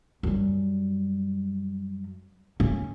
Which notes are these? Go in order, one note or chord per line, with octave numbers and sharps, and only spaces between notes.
F#2 G3
C#4